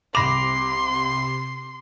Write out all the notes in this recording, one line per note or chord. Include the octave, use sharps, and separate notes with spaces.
C2 C3 B5 C6 D6 A#6 F7